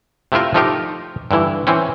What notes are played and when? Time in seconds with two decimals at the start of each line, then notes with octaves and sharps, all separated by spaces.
0.32 C3 A3 E4 F4 A#4
0.54 F3 A3 D#4 F4 G4 A#4
1.31 G2 D3 E3 E4
1.67 E3 C4 C#4